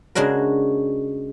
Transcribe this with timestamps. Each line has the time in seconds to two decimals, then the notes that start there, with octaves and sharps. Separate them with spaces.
0.15 C#3 G#3 D4 F#4 A#4